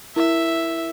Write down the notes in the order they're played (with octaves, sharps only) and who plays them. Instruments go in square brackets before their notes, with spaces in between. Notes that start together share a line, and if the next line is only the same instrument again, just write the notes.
[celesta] E4 A#4 [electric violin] E5